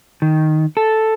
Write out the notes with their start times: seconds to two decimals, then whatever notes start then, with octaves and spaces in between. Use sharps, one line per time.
0.22 D#3
0.77 A4